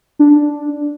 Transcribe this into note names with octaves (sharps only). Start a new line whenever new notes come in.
D4